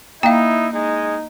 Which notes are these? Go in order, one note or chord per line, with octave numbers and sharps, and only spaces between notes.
A#3 D#4 E4 F5 G5
G#3 D#4